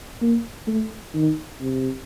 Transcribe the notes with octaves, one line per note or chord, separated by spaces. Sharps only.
A#3
A3
D#3
C3